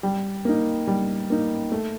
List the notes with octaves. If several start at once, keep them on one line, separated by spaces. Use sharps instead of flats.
G3
A#3 D#4
G3
A#3 D#4
A3